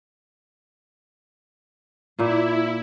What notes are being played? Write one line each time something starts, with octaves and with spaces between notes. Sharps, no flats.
A#2 A#3 E4